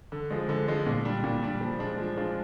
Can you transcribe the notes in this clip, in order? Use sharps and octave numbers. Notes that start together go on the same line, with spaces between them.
D3
F3 G#3
D3
F3 G#3
A#2
G3 D4
A#2
G3 D4
F3
G#3 D4 F4
F3
G#3 D4 F4